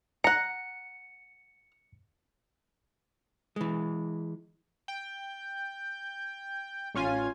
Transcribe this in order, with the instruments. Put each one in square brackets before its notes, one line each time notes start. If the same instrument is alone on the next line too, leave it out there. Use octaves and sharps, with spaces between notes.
[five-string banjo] F#5 A#5 [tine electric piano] C#7
[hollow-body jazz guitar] E3 G#3
[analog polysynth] G5
A1 C#4 F4 G#5